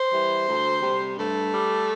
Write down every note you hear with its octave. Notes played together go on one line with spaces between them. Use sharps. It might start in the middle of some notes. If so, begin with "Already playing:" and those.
Already playing: C5
E3 G3
D2
C3 G3
G2 A3
G3